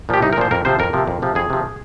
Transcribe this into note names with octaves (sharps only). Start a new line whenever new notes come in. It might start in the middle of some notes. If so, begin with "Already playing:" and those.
A#2 F3 G4
C2 D#4
A#4
A#2 F3 C5
F2 A#4
C3 F3 C5
F2 A#4
C3 F3
F2
C3 F3
F2 G#4
C3 F3